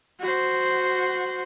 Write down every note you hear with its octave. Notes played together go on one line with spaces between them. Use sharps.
F#4 C5